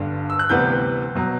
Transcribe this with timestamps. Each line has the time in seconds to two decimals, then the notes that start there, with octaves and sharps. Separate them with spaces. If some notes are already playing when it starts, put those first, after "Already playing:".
Already playing: G1 G2 D3
0.30 E6
0.39 F#6
0.49 D2 C3 E3 G3 B3 G6
1.15 B2 F#3